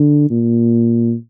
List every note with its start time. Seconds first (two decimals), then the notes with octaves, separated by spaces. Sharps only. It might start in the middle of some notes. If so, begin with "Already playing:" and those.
Already playing: D3
0.30 A#2